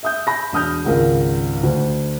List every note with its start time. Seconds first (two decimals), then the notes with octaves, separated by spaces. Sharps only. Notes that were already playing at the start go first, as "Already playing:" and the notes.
0.03 E5 D#6 G6
0.27 B5 A#6
0.52 E1 D4 D#6 F6 G6
0.84 G#1 C#2 A#4
1.63 D2